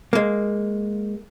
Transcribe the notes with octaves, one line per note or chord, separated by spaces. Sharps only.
G#3 A#3